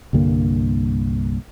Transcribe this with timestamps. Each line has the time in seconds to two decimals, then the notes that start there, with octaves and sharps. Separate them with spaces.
0.13 C2 G2 D3 A#3